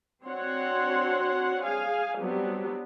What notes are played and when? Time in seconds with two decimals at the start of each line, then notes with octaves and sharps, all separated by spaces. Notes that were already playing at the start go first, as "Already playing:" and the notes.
0.24 C4 D4 F#4 C#5 F#5 C6
1.62 G#4 F5 G#5
2.16 F#3 G3 B3 C4 D4 G4